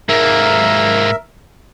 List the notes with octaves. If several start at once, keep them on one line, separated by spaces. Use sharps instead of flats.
G#2 A#3 A#4 E5